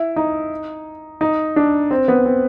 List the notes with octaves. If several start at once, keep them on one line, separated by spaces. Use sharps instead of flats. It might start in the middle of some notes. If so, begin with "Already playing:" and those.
Already playing: E4
D#4
D#4
D4
C4
B3
C4